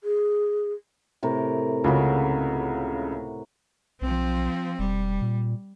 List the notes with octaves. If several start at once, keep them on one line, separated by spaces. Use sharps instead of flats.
G#4
A2 C3 A#4
C#2 C#3 F#4 D6
B1 F3 C4
E1 G3
A#2